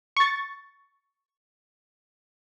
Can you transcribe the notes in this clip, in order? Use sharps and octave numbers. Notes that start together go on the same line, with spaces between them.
C#6 A6